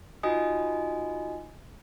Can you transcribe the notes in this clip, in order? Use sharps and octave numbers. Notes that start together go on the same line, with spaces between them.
D#4 F4 F#4 D#5 G#5 D#6